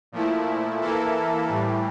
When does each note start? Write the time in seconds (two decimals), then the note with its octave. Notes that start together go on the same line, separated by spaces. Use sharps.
0.12 A#2 F3 A3 E4
0.81 E3 A#3 E4 A4
1.49 A2 E3 G3